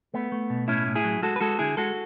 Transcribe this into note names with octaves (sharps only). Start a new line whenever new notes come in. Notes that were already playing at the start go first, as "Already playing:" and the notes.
A3 B3
A3
B2
A2 C#4 E4
A2
E4 G#4
F#3
G#3 F#4 A4
B4
G#3 F#4 A4
D3 E4 G#4
G#3 F#4 A4